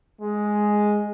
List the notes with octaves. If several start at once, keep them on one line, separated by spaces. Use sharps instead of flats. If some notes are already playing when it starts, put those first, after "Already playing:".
G#3